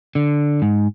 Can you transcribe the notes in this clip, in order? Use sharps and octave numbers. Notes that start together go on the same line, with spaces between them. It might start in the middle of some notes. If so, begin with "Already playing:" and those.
D3
G#2